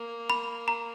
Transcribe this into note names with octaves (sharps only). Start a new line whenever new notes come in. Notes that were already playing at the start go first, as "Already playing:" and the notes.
Already playing: A#3
B5
A#5